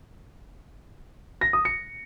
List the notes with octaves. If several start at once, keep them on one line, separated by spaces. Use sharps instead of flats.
A#6
D#6
C#7